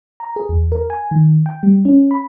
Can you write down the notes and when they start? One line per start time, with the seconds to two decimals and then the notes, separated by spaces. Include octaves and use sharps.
0.20 A#5
0.36 G#4
0.49 E2
0.72 A#4
0.90 G#5
1.11 D#3
1.46 G5
1.63 G3
1.85 C#4
2.11 B5